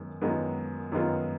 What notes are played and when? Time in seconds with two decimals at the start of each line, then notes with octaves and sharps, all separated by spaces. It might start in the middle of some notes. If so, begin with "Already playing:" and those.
Already playing: F#2 D#3 G#3 B3
0.22 F#2 D#3 G#3 B3 F4
0.92 F#2 D#3 G#3 B3 F4